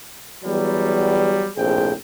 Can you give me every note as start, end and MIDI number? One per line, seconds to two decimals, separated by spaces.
0.44 1.49 40
0.44 1.49 54
0.44 1.49 55
1.56 1.92 34
1.56 1.92 45
1.56 1.92 48
1.56 1.92 68
1.56 1.92 79